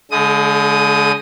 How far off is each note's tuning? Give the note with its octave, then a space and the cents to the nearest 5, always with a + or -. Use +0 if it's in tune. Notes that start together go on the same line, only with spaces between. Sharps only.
D3 -30 G#3 +25 D#6 +0